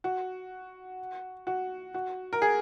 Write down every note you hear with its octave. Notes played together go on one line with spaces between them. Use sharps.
F#4
F#4
F#4
A#4
G#4